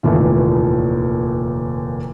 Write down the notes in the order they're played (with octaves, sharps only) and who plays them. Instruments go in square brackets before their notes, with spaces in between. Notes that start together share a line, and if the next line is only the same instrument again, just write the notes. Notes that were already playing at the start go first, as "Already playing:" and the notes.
[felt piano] F1 D#2 A#2 E3